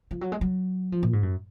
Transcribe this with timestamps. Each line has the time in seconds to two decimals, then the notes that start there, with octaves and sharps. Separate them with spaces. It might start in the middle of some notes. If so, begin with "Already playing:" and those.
0.11 F3
0.21 F#3
0.32 G#3
0.41 F#3
0.92 F3
1.03 A#2
1.13 G#2
1.23 F#2